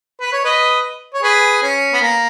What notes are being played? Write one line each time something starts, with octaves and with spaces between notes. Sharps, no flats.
B4
C#5
B4 D#5
C#5
G#4 B4
C#4
B3
A#3